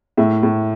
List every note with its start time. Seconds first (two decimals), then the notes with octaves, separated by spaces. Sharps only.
0.17 A2 E5
0.43 A2